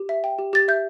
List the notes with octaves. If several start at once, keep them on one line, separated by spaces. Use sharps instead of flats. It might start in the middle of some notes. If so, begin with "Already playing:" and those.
Already playing: G4
E5
G5
G4
G4 A6
E5 G6